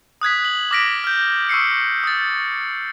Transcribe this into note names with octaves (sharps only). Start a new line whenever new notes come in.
D#6 F#6 G#6 B6
F#7
D6 F6 A#6 B6 D7
F6 G6
C#6 E6 C7 C#7
D#6 A6